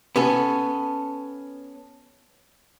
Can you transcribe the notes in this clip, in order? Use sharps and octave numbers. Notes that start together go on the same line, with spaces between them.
B3 C#4 A4